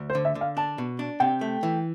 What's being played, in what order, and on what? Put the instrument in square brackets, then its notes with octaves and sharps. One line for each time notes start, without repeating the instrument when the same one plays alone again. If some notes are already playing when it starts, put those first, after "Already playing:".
Already playing: [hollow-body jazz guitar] D2
[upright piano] C5
[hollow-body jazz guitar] D3
[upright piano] E5
[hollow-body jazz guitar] D3
[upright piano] F5
[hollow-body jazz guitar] D4 [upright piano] A5
[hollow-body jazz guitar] B2
D4
[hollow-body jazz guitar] C3 [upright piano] G5
[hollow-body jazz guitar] A3
E3